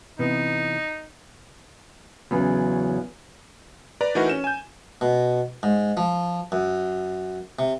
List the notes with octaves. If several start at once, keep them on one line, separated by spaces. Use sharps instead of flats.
C3 E3 B3 D#4
E2 C#3 F#3
B4 D5 A#5
E3 A3 D#4 F#4 A#4 B4
C#4 E7
G#5 G6
B2
G#2
F3
F#2
C3